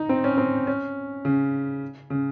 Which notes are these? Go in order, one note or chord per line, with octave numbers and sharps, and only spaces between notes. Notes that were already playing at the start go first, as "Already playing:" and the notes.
Already playing: D#4
C4
C#4
C4
C#4
C#3
C#3